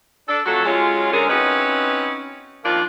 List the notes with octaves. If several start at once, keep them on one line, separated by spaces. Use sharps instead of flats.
D4 A4
F2 F#3 A3 F#4 A4
F#3 G#3 C#4 F4
D3 G#3 C#4 G#4 A#4
C4 C#4 D#4 E4 F#4 B4
D#3 F3 A#3 D4 F4